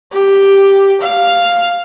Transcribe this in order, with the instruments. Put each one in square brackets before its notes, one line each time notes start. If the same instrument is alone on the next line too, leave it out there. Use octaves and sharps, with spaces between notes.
[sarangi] G4
F5